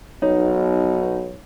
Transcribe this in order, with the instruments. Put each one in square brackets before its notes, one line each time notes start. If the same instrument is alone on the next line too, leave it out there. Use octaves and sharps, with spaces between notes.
[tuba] B1 [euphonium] B2 [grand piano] D#4 [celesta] C#5